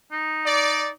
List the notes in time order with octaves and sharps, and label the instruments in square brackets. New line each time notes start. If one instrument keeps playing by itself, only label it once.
[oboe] D#4
[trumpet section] D5